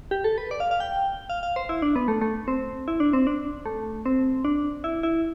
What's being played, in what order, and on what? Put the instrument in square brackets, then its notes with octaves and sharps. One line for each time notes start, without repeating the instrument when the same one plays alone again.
[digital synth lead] G4
A4
B4
D5
F5
F5
G5
F5
F5
C5
E4
D4
B3
A3
A3
C4
E4
D4
C4
D4
A3
C4
D4
E4
E4